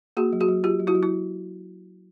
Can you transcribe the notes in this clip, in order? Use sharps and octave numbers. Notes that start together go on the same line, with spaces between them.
A#3 F#4 G#4
F#3
F#4 G#4
F#3
F#3 F4 G4
F#3
E4 F#4
F#3
E4